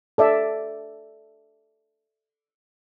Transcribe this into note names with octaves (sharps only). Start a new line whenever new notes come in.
A4 D5 E5